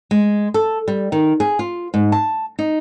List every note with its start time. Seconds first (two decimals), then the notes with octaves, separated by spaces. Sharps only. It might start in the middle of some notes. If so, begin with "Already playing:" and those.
0.11 G#3
0.54 A4
0.88 G3
1.12 D#3
1.40 G#4
1.59 F4
1.94 G#2
2.12 A5
2.59 D#4